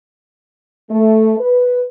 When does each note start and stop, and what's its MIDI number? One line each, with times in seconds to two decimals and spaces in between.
0.90 1.33 57
1.38 1.81 71